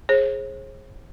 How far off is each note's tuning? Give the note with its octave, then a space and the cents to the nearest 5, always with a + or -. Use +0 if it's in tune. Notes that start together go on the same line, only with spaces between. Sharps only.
G#4 +5 C5 +45